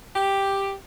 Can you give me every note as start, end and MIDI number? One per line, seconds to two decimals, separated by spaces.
0.16 0.73 67